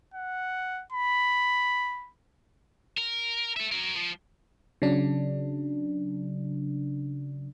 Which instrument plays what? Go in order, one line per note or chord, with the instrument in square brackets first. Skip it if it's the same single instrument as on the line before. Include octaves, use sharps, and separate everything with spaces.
[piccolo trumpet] F#5
B5
[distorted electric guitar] A#4
A4 E5
F#3 A#4
F3
[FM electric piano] C#3 F#3 D4